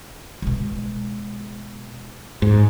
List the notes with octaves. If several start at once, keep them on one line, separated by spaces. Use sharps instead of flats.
B2 G#3
G#2